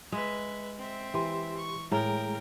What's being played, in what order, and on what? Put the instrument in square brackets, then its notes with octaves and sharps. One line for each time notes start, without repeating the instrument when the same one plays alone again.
[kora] G#3 [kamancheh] B4 E5
[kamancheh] C4 E5
[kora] E3 [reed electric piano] G4 C6
[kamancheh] C#6
[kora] A2 [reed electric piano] G#3 G#4 A#5 [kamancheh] A#4 G5